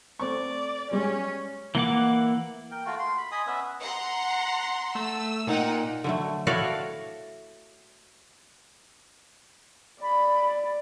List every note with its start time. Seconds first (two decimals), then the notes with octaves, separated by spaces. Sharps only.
0.20 A3 C4 D5 C#6
0.91 G3 G#3 C#4 C#5
1.75 E3 A#3 F#5 D6
2.71 A#4 G5
2.86 A3 F4 F#4
2.99 C6
3.18 B5
3.32 D#5 G#5 B5 D#6
3.47 B3 C#4 B4 E5
3.80 F#5 A#5 C6
4.95 A3 E6
5.47 A#2 D#4 F#5 G5
6.04 D3 F#3 A3
6.47 E4 F#4 A4 C#5 D5 F5
10.02 D5 B5